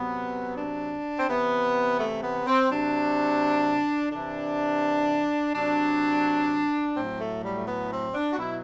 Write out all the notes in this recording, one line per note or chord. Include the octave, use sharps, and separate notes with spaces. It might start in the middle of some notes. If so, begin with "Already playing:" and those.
Already playing: C3 F#3 B3
D4
C4
C3 E3 B3
A3
B3
C4
C3 F#3 D4
C3 E3 D4
C3 F#3 D4
A2 F#3 C4
A3
G3
A3
B3
C4
D4
F#4
B2 F#3 E4